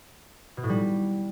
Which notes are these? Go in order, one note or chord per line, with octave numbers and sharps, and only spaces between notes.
B2
A2
G3